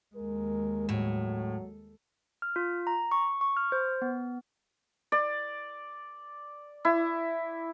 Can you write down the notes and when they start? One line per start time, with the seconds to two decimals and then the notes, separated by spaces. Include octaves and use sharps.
0.16 D#2 G#3 A#4
0.89 A2 F#3
2.42 F6
2.56 F4
2.87 A#5
3.12 C#6
3.41 C#6
3.57 F6
3.72 C5
4.02 B3
5.12 D5
6.85 E4